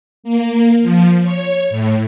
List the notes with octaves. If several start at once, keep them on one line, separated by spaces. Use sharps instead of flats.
A#3
F3
C#5
A2